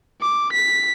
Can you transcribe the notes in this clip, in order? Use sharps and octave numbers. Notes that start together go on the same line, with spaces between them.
D6
B6